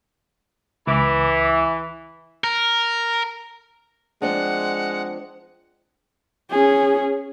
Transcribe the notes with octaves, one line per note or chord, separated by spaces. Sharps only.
C#2 E3 D6
A#4
F3 G#3 C4 D4 F#5
C#4 G#4